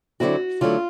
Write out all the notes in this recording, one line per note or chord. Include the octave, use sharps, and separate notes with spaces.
D3 F#3 A3 C4 E4 F#4
D3 F#3 A3 C4 E4 F4